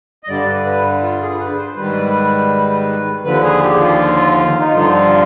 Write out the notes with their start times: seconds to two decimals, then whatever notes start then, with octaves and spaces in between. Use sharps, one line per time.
0.23 D#5
0.28 G2 D3 G3 D5
0.47 B4
0.66 B4
1.03 F4
1.22 G#4
1.40 B4
1.58 C5
1.76 G#2 D#3 G3 B4
3.25 D#2 D3 F3 B4
3.43 G#4
3.62 G4
3.81 F4
4.60 D#4
4.72 G2 D3 F3 F4